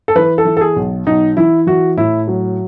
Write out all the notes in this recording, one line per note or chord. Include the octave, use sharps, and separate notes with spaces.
A4
E3 B4
A4
E3
A4
G#4
B1
B1 D#4
E3 E4
E3 F#4
A2 E4
F#3